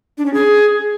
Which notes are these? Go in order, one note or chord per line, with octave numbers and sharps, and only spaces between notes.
D4
C#4
G#4